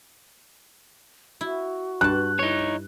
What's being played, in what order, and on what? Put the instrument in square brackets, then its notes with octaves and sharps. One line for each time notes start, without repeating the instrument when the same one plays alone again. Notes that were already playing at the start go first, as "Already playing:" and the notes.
[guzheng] E4 [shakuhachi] F#4
[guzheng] G2 A5 [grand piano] F#6
[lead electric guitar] D#4 C#5 [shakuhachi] E4